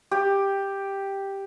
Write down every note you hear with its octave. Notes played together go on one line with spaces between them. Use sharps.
G4